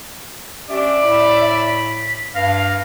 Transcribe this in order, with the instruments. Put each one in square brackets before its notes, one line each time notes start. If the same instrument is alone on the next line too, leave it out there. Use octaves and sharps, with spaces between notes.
[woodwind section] C#4 D4 G4 [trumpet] D5 [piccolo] E5
[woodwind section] A2 B5
[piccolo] B6
[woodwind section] G2 [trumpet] F5 [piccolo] A#6